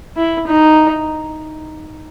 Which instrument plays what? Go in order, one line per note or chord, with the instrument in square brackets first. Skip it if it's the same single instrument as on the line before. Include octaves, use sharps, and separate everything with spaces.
[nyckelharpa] E4
D#4